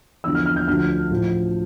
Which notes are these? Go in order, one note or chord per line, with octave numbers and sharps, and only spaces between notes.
E2 D3 F3 E6
F6
F6
G6
D2 D3 F3 F6
A1 A2 F3